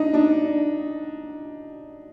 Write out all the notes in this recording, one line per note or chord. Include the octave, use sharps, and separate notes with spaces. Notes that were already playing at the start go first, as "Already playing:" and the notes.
Already playing: D4 D#4
D4